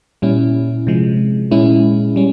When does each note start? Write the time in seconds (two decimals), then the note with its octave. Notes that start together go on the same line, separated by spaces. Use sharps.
0.22 A#2 G3 C#4 E4
0.87 C3 F3 G#3
1.51 A#2 G#3 C#4 E4
2.16 G3 C#4